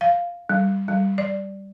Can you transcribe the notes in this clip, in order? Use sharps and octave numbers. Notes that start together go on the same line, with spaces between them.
F5
G3
G3
D5